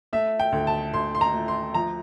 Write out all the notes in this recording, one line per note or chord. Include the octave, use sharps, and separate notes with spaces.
A3 E5
G5
D2
A5
D2 C6
C6
A#5
A3
C6
F3 A#5